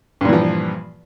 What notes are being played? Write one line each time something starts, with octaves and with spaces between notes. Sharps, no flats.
G2 A#2 E3 F3